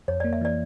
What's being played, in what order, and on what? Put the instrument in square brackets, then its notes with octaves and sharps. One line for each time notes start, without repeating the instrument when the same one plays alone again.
[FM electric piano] F2 [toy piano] C#5
[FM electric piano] A#3 [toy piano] D5
[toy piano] E5
[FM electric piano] E3 [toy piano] D5